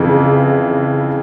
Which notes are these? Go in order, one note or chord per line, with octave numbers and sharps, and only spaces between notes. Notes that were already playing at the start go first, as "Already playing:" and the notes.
Already playing: F2 C#3 E3